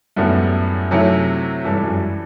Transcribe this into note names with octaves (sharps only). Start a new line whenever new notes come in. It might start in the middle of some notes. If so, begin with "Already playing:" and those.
F#2 A2 G3 B3 E4 A4
C3 F#3 A3 E4
G2 E3 G3 D4 A4
F#2